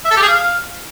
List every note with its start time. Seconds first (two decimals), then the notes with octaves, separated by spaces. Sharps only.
0.05 E5
0.11 A4
0.17 G4
0.22 G#4
0.28 F5